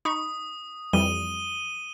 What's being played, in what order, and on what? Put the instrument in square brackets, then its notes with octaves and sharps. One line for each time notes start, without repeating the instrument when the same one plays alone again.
[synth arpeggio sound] D#4 B5 C#6 [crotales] D#6
[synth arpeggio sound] F2 E3 G3 [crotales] D#7 G7